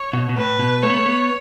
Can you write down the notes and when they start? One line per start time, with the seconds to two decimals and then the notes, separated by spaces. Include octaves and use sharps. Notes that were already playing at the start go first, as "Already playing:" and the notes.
Already playing: C#5
0.13 B2
0.29 B2
0.37 A2 B4
0.59 B2
0.82 A3 C#5
0.90 B3
0.96 A3
1.06 B3